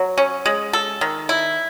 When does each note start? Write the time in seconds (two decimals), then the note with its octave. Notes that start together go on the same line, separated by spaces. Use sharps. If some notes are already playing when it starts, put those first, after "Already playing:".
Already playing: F#3
0.18 C#4
0.46 G#3
0.73 A4
1.01 D#3
1.29 E4